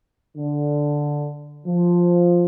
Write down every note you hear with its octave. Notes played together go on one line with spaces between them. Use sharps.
D3
F3